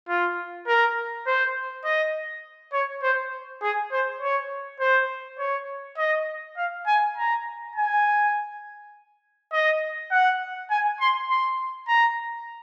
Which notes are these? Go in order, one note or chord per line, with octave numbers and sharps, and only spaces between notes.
F4
A#4
C5
D#5
C#5
C5
G#4
C5
C#5
C5
C#5
D#5
F5
G#5
A#5
G#5
D#5
F#5
G#5
C6
C6
A#5